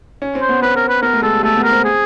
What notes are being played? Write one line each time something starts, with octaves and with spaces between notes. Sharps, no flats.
C#4
C4
C5
B3
C4 B4
A#4
B4
B3 A#4
A3
G#3 A4
G3
A3 A4
B3
A#4
C4
G#4